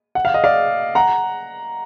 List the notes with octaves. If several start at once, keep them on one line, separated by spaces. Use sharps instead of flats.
F#5
F5
D#5
D5 F5
F#5 A#5